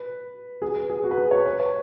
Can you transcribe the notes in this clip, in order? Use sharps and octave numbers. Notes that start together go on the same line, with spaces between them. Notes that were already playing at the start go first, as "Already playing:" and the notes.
Already playing: B4
G#4
B4
G#4
F#4
B4
G#4
C#5
B4
C#5